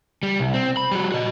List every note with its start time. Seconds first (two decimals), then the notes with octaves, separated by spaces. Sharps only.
0.23 G3
0.40 C2
0.54 C4
0.77 B5
0.91 G3 F#4
1.12 F#4 D#5